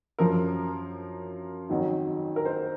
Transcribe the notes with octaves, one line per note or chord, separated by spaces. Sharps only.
F#2 F3 A#4
F2 D#3 F#3
A#4
C5